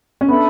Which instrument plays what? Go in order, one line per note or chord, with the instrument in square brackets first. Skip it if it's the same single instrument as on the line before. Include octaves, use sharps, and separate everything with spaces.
[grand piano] C#4
[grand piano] B3 [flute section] D4 A4 E5 B5